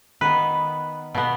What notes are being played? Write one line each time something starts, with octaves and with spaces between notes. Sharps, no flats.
D#3 B3 B4
B2 B3